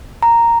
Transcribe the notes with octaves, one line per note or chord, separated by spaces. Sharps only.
A#5